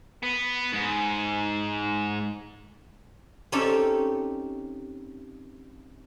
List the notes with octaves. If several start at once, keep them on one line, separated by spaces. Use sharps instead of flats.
B3
G#2
C4 C#4 D#4 G4 A4